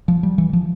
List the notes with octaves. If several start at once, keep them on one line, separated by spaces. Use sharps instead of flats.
F3
G3
E3
F3